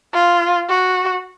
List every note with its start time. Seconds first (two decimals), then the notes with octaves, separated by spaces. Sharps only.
0.13 F4
0.69 F#4